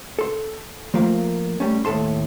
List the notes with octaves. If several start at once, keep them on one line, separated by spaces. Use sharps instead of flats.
A4 C6
F3 A3 A#3 A#4 F5
G3 A3 C#4
D#2 A2 A4 A5 C6